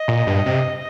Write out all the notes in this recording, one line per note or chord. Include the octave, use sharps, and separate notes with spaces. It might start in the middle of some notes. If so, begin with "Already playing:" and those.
Already playing: D#5
A#2
G2
C3